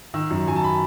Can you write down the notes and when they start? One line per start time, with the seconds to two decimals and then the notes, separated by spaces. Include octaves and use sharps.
0.14 D#3 E6
0.30 F#2
0.47 F#2 G#5
0.56 A5
0.64 B5